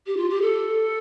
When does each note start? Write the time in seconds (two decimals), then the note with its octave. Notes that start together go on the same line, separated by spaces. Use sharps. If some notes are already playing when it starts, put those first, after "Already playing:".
0.06 G4
0.17 F4
0.30 G4
0.42 A4